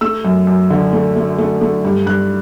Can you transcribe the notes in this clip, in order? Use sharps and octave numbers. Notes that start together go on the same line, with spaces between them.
A3 E6
F#2
F#2
D3
A3
A3
A3
A3
G2
G2 F#6